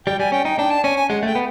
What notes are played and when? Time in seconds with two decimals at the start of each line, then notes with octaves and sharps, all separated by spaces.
0.06 G3 G5
0.19 G3 G#5
0.32 C#4 G5
0.45 D#4 G5
0.58 D4 G5
0.70 A5
0.84 C#4 G#5
0.96 G#5
1.09 G#3 F#5
1.23 A3 G5
1.35 B3